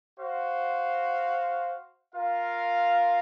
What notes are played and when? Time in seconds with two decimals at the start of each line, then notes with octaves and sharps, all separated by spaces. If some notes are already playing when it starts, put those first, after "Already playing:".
0.18 F#4 C5 F5
2.14 F4 A#4 F5